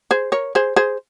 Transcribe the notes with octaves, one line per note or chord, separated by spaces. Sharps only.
G#4 C5
A#4 C#5
G#4 C5
G#4 C5